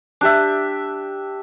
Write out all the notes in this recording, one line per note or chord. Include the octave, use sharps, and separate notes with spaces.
D4 G4 E5